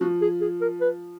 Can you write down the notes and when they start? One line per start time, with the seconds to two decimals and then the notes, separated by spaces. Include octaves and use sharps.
0.01 F3 F#4
0.21 G#4
0.41 G#4
0.61 A#4
0.81 B4